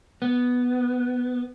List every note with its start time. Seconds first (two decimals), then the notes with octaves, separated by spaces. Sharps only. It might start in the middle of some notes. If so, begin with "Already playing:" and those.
0.22 B3